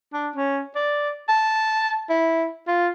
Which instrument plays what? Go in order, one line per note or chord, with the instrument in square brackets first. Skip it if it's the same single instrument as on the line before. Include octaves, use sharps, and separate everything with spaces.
[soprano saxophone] D4
C#4
D5
A5
E4
F4